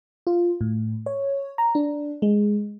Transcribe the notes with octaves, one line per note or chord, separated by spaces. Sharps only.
F4
A2
C#5
A#5
D4
G#3